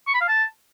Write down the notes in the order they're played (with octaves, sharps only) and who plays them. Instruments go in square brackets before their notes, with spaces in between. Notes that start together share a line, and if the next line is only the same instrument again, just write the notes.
[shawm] C#6
B5
F5
A5